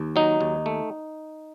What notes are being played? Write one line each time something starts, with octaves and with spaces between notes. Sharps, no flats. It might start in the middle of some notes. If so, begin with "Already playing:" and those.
Already playing: D#2
F#3 D#4
D#2
A3